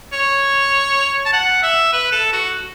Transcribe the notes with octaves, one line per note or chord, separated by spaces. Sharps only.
C#5
A5
F#5
E5
B4
A4
F#4